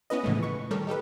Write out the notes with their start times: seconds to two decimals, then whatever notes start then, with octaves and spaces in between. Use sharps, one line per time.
0.10 B3 C#4 E4 B4 D#5
0.24 A2 C#3 E3 F3 G#3 A3
0.43 B4 C#6
0.71 D#3 G3 G4 A4 A#4 C#5
0.87 D#4 G4 A4 B4